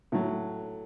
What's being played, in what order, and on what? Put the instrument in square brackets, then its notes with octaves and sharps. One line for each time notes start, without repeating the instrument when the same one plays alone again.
[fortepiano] A2 F#3